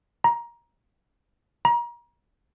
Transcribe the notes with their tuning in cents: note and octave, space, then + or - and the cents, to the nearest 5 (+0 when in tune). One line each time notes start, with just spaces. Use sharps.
A#5 +20
A#5 +35